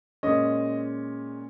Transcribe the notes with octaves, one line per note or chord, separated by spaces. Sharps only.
A#2 G#3 C#4 D#5